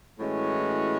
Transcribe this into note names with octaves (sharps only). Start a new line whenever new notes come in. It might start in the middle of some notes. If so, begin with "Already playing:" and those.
A2 E3 G#3 C#4 F#4